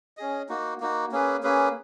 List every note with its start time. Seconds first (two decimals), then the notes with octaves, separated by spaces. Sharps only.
0.17 C#4 G#4 D#5
0.49 A#3 D#4 F#4
0.81 A#3 D#4 F#4
1.12 A#3 C#4 G#4 B4
1.43 A#3 C#4 G#4 B4